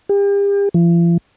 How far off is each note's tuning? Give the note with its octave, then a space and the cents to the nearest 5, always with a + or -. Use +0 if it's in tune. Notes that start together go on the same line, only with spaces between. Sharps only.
G4 +40
F3 -45